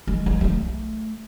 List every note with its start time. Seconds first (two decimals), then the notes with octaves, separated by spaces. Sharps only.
0.07 G#3
0.26 G#3
0.41 G#3
0.44 A3